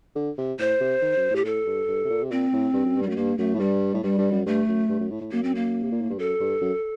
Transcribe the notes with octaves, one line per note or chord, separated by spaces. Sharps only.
D3
C3
A2 C5
C3
D#3
F#2
A2
G4
A2 A4
G2
G2
C3
A#2
C3
A#2 C4
A2
G2
F#2
G2
G3
F#2
A3
G2 A#3
F#2 A3
A2
G2 G3
A2
G2 G3
G2
F#2
G2 A3
F#2
G2
F#2
A2
A2
F#2 A#3
C4
A#3
C3
A#2
A2
G2
F#2 A4
G2
F#2